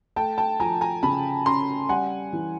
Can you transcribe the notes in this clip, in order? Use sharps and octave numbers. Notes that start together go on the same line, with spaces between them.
A3 G5 A5
G5 A5
F3 G#5 A#5
G#5 A#5
C#3 A5 B5
C#4 A#5 C6
G3 F#5 G#5
E3